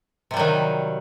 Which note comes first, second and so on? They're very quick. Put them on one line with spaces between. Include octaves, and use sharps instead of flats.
C3 G3 F#3 D#3